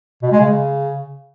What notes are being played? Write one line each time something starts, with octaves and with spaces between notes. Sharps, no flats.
B2
G#3
C#3